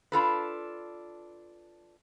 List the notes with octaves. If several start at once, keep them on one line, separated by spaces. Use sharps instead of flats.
D4 F4 A4 B4